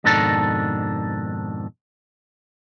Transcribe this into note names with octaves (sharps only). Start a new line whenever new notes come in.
F2 G#2 B2 D#3 D4 A4